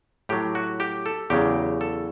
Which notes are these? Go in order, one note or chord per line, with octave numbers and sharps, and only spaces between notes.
A2 F#3 G4
F#4
G4
A4
E2 C#3 F#3 G4
A4